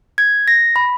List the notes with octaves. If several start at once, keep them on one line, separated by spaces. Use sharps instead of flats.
G#6
A#6
B5